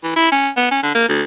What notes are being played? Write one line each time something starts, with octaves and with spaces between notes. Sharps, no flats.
E3
E4
C#4
B3
C#4
D3
A#3
D2